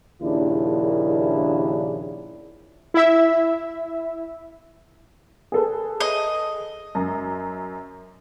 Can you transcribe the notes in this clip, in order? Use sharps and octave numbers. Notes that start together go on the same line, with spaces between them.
A#1 D#2 C#3 D4 E4
E4 E5
G#4 A4 B4
D#5
F#2